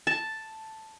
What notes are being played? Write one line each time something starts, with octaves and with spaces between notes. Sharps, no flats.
A5